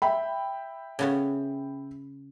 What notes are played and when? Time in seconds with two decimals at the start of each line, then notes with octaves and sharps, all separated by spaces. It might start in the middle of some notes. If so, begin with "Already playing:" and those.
0.02 E5 G5 B5
0.99 C#3 B3 C#4